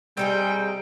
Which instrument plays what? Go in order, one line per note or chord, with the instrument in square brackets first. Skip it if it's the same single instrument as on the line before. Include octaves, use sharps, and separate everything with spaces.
[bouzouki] C3 D#4 G#4 [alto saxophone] G3 [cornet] G5